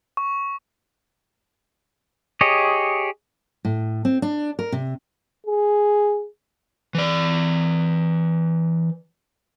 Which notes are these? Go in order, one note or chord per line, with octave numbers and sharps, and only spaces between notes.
C#6
G4 G#4 C#5 D#5
A2
C4
D4
A#4
C3
G#4
E3 D5